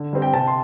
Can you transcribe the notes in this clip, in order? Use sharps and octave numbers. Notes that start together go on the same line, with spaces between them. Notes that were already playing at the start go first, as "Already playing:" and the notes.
Already playing: D3
G3 C4
G5
C3 A5
C6